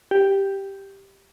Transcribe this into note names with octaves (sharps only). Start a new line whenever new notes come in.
G4